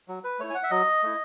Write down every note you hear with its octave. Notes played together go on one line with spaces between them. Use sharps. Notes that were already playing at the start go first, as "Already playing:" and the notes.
F#3
B4
A3 E4 C#5
G#5
F#5
E5
F#3 D#5
A3 E4